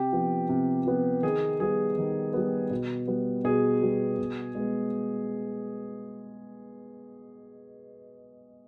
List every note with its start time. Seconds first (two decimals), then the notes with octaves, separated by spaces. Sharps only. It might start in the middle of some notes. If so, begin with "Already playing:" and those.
Already playing: C3 G4
0.13 F3 B3
0.49 C3
0.86 F3 B3
1.23 D#3 G#4
1.60 G3 B3 G#4
1.98 D#3
2.34 G3 B3
2.71 B2
3.08 G3 B3
3.44 B2 G#4
3.82 G3 B3
4.19 B2
4.55 G#3 B3